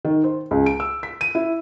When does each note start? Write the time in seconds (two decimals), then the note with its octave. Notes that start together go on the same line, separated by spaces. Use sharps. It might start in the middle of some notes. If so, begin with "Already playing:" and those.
0.05 D#3
0.24 C5
0.51 C#2
0.66 D7
0.80 E6
1.03 B6
1.21 D#7
1.35 E4